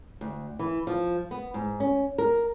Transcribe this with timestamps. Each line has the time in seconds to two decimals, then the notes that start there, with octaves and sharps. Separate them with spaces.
0.21 D2
0.59 E3
0.87 F3
1.31 B3
1.54 G#2
1.80 C#4
2.18 A#4